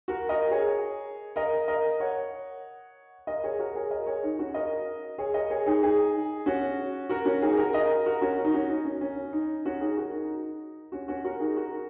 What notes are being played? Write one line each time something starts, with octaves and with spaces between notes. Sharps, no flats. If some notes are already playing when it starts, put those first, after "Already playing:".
F#4 A#4
A#4 D#5
G#4 C#5
A#4 D#5
A#4 D#5
C#5 F#5
A#4 D#5
G#4 C#5
F#4 A#4
G#4 C#5
A#4 D#5
G#4 C#5
D#4
C#4 F#4
A#4 D#5
G#4 C#5
A#4 D#5
G#4 C#5
D#4 G#4
D#4 G#4
C#4 F#4
F#4 A#4
C#4 F#4
D#4 G#4
F#4 A#4
A#4 D#5
F#4 A#4
C#4 F#4
D#4
C#4 F#4
D#4
C#4
C#4
D#4
C#4 F#4
D#4 G#4
F#4 A#4
D#4
C#4 F#4
C#4 F#4
F#4 A#4
D#4 G#4
F#4 A#4